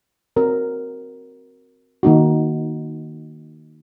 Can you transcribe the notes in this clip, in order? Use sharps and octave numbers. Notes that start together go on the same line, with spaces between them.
C4 F#4 A#4 C#5
D#3 A#3 D#4 F#4